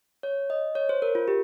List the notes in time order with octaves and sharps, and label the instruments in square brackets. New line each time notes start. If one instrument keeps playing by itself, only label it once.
[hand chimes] C#5
D#5
C#5
C5
A#4
F4
G4